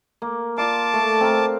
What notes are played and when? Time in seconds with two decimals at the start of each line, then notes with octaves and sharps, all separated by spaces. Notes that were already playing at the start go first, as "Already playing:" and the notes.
0.22 A#3
0.58 F4 D5 F5 A5 D6
0.93 A3
1.21 C4 A#4